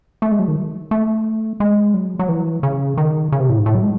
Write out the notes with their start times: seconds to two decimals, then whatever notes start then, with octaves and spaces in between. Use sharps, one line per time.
0.22 A3
0.32 G#3
0.39 F#3
0.48 D#3
0.91 A3
1.60 G#3
1.94 F#3
2.19 F#3
2.29 E3
2.63 C#3
2.97 D#3
3.32 C#3
3.40 C3
3.49 A2
3.58 G#2
3.66 A2
3.75 F#3
3.83 G#3